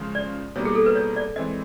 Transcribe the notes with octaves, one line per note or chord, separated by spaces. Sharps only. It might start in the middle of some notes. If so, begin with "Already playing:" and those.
Already playing: C#3 F3 G#3
D5
B2 G3 A#3 D#4 C#5
G#4
A4
B4
C#5
D5
E3 G#3 C4 D#5